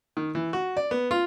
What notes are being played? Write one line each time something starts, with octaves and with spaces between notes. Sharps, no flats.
D#3
E3
F#4
D5
B3
F4